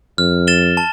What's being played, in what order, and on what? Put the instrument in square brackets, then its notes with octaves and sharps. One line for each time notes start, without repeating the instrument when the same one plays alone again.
[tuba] F2 [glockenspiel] F6
[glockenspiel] A6 E7 G7
A5